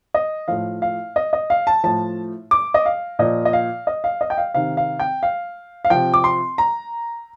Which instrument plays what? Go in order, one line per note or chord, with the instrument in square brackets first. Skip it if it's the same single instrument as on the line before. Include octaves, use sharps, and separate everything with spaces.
[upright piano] D#5
A2 F3 F5
F5
D#5
D#5
F5
A5
A2 F3 A5
D6
D#5
F5
A#2 F3 D#5
D#5
F5
D#5
F5
D#5
G5
F5
C3 D#3 F5
F5
G5
F5
F5
C3 F3 G5
D6
C6
A#5